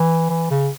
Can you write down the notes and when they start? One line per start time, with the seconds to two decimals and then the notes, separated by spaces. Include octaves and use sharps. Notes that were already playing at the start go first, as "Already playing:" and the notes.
Already playing: E3
0.30 E3
0.50 C#3